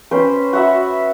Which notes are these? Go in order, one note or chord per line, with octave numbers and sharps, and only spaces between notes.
C#4 B4 C5 G5
F#4 E5 B5